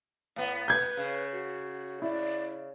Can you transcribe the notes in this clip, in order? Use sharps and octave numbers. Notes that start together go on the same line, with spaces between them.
A2 B3
B4 G6 G#6
C#3
F#4
E4 D5